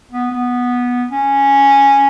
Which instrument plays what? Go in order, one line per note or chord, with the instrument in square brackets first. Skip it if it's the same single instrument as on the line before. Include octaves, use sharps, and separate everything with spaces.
[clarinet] B3
B3
C#4